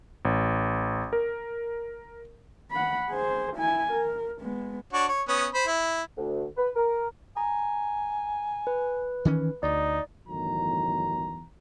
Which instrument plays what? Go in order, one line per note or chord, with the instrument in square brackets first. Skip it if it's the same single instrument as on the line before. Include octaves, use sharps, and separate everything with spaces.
[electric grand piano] A1
A#4
[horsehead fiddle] F#5 B5
G#4 C5
E4 G#5
A#4
G#3 B3
[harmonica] D4 F#4 C#5
C#5
B3 C#4 D#6
C5 B5
E4
[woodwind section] D2
B4
A#4
[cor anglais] G#5 [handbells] A#5
[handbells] B4
[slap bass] D#3 E3 C#4
[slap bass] D2 [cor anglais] D#4 [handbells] D5
[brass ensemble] G1 E2 A2 D#3 F#3 A#5